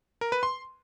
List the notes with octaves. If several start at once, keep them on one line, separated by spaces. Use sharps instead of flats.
A#4
B4
C6